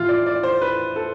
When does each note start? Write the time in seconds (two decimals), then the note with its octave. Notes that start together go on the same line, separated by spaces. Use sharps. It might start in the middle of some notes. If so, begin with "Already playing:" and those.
Already playing: A2 E3 F4
0.09 D5
0.26 D5
0.43 C5
0.61 B4
0.96 A4